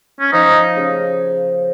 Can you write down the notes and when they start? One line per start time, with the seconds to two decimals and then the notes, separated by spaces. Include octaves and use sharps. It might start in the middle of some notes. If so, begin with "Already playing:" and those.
0.20 C#4
0.32 F3 D#4
0.77 C#3